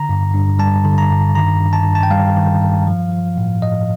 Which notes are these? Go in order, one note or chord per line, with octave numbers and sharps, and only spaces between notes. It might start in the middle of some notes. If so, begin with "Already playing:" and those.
Already playing: D3 A#5
G2
G2
G3 A5
D3
A#5
G2
D#3 A#5
G2
A5
G2
A5
G5
G3 F5
D#3
G2
F3
F3
A2
A2 D#5